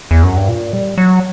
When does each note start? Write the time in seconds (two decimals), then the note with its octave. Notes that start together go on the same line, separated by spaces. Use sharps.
0.11 E2
0.23 F#2
0.36 G2
0.48 A#2
0.73 G3
0.98 F#3